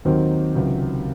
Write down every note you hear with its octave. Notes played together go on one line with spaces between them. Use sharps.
D#2 D#3 F#3 C4 D#4
C#2 C3 D#3 F#3